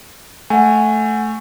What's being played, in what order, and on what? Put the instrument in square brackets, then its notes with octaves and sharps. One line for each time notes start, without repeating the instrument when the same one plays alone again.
[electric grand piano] A3 [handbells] F#5 G#5